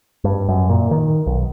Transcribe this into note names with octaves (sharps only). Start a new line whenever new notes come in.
G2
F#2
A#2
D#3
B1